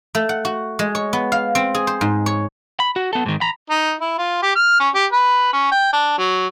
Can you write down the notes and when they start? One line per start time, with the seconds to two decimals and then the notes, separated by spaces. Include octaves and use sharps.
0.15 A3
0.29 F#5
0.45 F#4
0.79 G#3
0.95 C#5
1.13 B3
1.32 F5
1.55 C4
1.75 G#4
1.87 C5
2.01 G#2
2.26 C#5
2.80 B5
2.96 F#4
3.13 B3 A4
3.26 G#2 D#3
3.41 A#5 B5
3.70 D#4
4.01 E4
4.18 F4
4.43 G4
4.56 F6
4.80 C#4
4.95 G4
5.12 B4
5.53 C#4
5.72 G5
5.93 D4
6.18 F#3